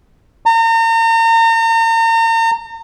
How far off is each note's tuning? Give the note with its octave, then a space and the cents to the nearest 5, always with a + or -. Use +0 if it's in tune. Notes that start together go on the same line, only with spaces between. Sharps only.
A#5 -40